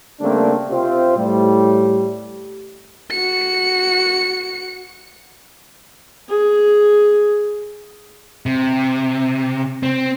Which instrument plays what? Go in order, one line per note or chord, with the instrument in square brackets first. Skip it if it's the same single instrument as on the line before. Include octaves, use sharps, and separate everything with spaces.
[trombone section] C#3 G3 A3 A#3 C4 D4
C3 C4 F4 G4 C5
A2 G3
[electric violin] F#4 C#7
[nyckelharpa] G#4
[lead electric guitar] C3
C4